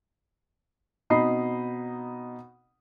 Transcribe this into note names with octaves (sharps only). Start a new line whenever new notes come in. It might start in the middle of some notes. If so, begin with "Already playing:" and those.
B2 C4 D#4 D#5 B5 C7